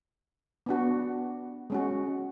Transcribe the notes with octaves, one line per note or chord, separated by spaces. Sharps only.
B3 D4 F#4
G#3 C#4 F#4